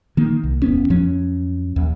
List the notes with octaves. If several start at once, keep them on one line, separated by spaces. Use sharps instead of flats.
D#3 A#3
C2
D1 E2 B3 C#4
F2 F3 F#3 C#4
D#2